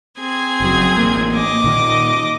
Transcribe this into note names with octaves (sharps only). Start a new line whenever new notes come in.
C4 G#4 G#6
F#1 F#3
A1 A#3
D#5 D6
A#2 D#3